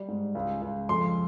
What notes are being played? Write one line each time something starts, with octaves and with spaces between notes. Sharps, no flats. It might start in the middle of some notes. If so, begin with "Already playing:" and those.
Already playing: G3
G#2
C#2
C#2
F2 C6